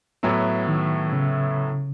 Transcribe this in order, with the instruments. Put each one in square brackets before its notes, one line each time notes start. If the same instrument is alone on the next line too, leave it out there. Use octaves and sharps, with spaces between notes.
[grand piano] A2 F#3 B3 E4
[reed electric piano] D#3
C#3